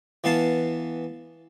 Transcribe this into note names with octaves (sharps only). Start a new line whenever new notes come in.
E3 B3 F5 A5